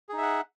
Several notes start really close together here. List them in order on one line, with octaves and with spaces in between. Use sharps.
G#4 D#4 E5 F#5